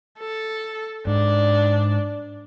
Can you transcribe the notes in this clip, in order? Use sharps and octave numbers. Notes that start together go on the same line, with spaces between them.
A4
G#2 D4